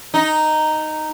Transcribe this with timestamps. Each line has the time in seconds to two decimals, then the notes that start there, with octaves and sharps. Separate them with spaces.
0.14 D#4